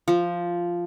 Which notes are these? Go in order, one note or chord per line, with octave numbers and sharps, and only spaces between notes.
F3